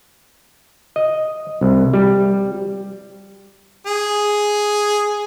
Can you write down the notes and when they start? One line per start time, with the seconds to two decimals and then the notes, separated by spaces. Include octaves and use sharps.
0.96 D#5
1.61 C2
1.93 G3
3.86 G#4